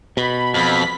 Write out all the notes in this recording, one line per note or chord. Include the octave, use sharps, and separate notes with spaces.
B2 B5
F2 B5 B6